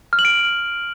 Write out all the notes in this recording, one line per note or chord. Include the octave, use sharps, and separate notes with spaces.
F6
F#7
D7